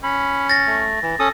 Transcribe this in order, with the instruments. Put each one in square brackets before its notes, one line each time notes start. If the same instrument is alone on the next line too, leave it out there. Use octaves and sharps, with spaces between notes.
[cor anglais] C#4 [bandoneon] B5
[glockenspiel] A6 A#6
[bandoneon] A3
E3
[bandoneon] C#4 D#6 [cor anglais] A4